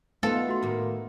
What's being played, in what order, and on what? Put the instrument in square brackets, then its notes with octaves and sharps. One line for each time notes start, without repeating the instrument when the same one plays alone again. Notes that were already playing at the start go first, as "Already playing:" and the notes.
[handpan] A3 B3 D#4 [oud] F4 B4 C5 [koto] A4 [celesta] F5
[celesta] F#4 C6
[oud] A2 D#3 A#3